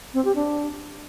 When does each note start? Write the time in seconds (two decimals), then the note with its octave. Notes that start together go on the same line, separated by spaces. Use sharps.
0.14 C4
0.25 G4
0.35 D4